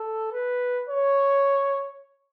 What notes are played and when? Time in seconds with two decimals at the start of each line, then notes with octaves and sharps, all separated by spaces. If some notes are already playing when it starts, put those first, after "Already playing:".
Already playing: A4
0.32 B4
0.89 C#5